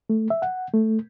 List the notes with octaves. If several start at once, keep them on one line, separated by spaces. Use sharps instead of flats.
A3
E5
F#5
A3